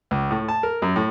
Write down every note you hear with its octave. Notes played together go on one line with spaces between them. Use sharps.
C#2
A2
A5
A#4
F#2
A2